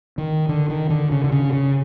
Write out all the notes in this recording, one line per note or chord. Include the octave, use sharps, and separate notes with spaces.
D#3
D3
D#3
D3
C#3
D3
C#3
C#3